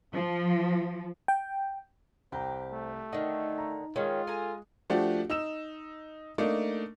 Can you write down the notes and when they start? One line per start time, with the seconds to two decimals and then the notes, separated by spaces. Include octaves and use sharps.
0.14 F3
1.28 G5
2.32 C2 G4 C5 A#5
2.72 A3
3.13 D3 D#3 D#4 D#5
3.58 A#5
3.96 D#3 G#3 C#4 F4 G#4
4.27 A4 G#5 A#5
4.90 F3 A3 D4 F#4 G4
5.30 D#4 E6 E7
6.38 A3 A#3 D4 D#4